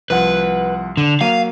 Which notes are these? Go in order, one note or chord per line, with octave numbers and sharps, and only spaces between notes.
C2 F3 B4 F#5
D3
F#3 A#3 F5 D#7